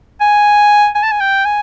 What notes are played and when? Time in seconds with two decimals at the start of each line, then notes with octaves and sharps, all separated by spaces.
0.20 G#5
0.95 G#5
1.03 A5
1.12 G#5
1.20 G5
1.45 G#5